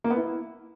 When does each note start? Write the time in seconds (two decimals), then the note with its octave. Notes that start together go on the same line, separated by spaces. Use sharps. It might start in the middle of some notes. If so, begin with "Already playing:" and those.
0.04 A#3
0.10 B3
0.16 E4